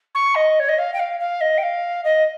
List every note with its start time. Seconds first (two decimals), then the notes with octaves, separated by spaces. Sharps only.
0.14 C#6
0.35 D#5
0.59 C#5
0.68 D#5
0.78 F5
0.93 G5
0.99 F5
1.19 F5
1.40 D#5
1.57 G5
1.63 F5
2.04 D#5